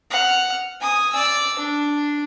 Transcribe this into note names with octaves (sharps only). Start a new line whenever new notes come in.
F#5 F6
G#5 D#6
D5 E6
D4